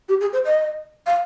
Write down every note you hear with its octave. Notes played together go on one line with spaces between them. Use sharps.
G4
G#4
C5
D#5
F5